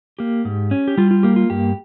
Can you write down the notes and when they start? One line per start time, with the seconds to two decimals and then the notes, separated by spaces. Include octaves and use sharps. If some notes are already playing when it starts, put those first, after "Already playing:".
0.19 A#3 G4
0.45 G#2
0.71 C#4
0.88 G4
0.97 G3 F4
1.11 F4
1.23 A#3 G4
1.36 F4
1.50 G2 G4